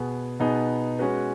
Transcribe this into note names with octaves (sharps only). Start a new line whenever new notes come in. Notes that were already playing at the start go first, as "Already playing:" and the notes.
Already playing: B2 B3 G#4
B2 B3 D#4 G#4
G#3 C#4 F#4 B4